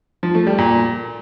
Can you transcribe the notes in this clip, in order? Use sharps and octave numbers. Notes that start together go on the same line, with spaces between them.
F3
A3
G3
A#2